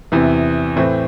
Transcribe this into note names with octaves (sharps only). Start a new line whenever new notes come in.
E2 C3 E3
A2 E3 C4